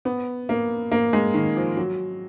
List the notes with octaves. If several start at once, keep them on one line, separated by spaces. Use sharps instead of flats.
B3
A#3
A#3
G#3
D#3
F3
F#3